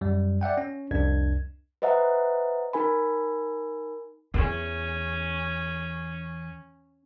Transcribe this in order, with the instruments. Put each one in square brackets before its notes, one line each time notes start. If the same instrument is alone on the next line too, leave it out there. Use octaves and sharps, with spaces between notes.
[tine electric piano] F#2 G3
D5 E5 F#5 G5
C#4
C2 F2 D4 G#6
[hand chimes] B4 C5 D#5 E5 F#5 A#5
D#4 A#4 G#5 B5
[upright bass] E2 [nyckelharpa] C#4